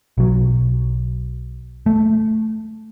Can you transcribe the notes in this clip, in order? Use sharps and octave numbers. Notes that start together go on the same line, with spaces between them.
B1 F#3
A3